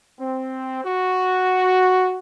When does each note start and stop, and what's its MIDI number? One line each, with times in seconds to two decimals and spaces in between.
0.19 0.82 60
0.84 2.19 66